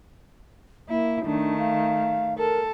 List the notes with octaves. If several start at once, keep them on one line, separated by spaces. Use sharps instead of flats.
A#3 E4
D#3 A3 D4
F5
A4 A#4